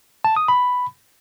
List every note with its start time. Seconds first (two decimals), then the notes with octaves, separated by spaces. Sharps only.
0.24 A5
0.36 D#6
0.48 B5